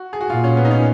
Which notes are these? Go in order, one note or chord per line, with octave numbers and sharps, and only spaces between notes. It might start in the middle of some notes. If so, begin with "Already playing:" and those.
Already playing: F#4
G#4
F#4
A#2 F4
C#4
B3
D#4
C#4